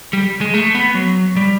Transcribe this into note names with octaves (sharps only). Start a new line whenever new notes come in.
G3
G#3
A3
B3
F#3
G3